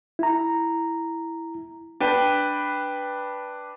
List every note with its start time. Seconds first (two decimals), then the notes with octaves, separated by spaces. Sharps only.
0.19 E4 A#5
2.00 D4 B4 G5